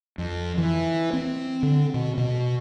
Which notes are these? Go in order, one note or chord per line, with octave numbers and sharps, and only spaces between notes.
F2
E3
C4
D3
B2
B2